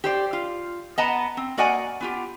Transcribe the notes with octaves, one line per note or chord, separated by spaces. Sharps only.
G4 C5 D5
F4
B3 B4 D#5 F#5 A5 A#5
C4
A#3 F#4 D5 D#5 F#5 G#5
B3 F4 G4